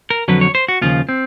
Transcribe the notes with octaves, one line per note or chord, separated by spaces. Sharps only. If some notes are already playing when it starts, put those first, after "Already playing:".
A#4
F2 D3 F#3 B4
C#5
C5
F#4
D#2 C#3 F3 F4
C4